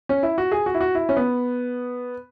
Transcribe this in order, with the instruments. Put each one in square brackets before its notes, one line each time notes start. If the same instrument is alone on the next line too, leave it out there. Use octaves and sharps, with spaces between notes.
[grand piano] C#4
E4
F#4
G#4
F#4
E4
F#4
E4
C#4
B3